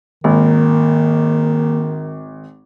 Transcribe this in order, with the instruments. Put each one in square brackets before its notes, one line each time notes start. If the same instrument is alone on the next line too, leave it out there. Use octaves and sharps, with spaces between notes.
[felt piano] G#1 [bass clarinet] D#3 [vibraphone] A#3